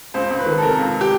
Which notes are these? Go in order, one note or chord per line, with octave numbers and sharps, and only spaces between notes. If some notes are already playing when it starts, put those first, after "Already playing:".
C#2 C5
C#2
B4
D#3
A4
C3 A#4
C#2
G4